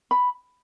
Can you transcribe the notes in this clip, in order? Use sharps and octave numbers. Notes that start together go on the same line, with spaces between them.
B5